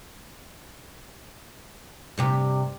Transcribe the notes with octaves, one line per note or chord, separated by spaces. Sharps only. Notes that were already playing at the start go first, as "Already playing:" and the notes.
G2 C3 G4